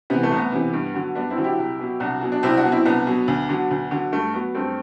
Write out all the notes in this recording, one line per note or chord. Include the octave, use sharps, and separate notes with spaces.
C3 E3 B3
A3
C2
B3
C3 E3
G2
D3 F#3
G2 B3 D4
C4 E4
D3 F#3
E4 G4
C2
B2 F#3
C2 D4 F#4
B2 F#3
D4
C2 C4 E4
D4 F#4
B2 F#3
C4 E4
C2 B3 D4
B2 F#3
D2
D3 F#3
D2
D3 F#3
G2 A3
F#3 B3
G2 A3 C4